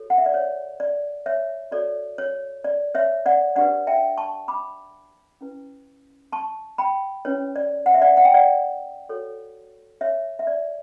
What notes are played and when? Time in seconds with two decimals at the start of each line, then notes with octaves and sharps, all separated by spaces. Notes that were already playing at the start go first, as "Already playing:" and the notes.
Already playing: F#4 A4 C#5
0.10 F#5
0.18 E5
0.26 D5
0.34 C#5
0.80 D5
1.26 C#5 E5
1.71 F#4 A4 C#5 D5
2.18 C#5
2.64 D5
2.95 C#5 E5
3.26 D5 F#5
3.56 D4 G4 B4 D5 F#5
3.87 E5 G5
4.18 A5 C#6
4.48 B5 D6
5.41 C#4 E4 B4
6.32 A5 C#6
6.78 G5 B5
7.25 C#4 E4 B4 C#5
7.56 D5
7.86 F#5
7.94 E5
8.02 D5 F#5
8.17 F#5
8.25 G5
8.34 D5 F#5
9.09 F#4 A4 C#5
10.01 C#5 E5
10.39 E5
10.47 D5